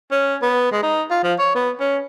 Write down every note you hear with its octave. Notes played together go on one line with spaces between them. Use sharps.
C#4
B3
G#3
D#4
F4
F3
C#5
B3
C#4